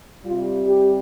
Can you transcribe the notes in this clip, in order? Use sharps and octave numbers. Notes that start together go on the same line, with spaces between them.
C3 G3 F4
G4